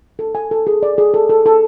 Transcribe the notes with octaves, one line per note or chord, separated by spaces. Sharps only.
A4
G#5
A4
G#4
D5
G#4
A4
A4
A4